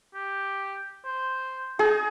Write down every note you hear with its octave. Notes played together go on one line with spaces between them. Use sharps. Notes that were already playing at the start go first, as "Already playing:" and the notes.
G4
C5
D#4 G#4